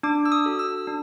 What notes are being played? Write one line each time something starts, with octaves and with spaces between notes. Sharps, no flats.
D4 D6
E6
D#6
F#4 A4
E6
D4